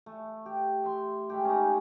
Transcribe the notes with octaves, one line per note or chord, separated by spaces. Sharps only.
A3
G4
E5 C6
G#3 A3 G4
C#4 D#4